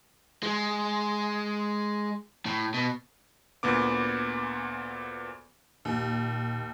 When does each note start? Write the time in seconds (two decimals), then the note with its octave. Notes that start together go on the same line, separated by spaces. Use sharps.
0.43 G#3
2.46 A2
2.74 B2
3.63 D2 A#2 B3 D6
5.85 D#2 A#2